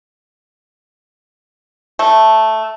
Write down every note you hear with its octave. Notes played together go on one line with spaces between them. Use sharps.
A3